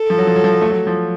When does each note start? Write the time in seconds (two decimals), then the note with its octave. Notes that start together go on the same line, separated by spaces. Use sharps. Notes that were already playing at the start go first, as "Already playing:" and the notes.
Already playing: A4
0.10 F3
0.18 F#3
0.27 F3
0.36 F#3
0.44 F3
0.53 F#3
0.61 A3
0.70 F#3
0.87 F3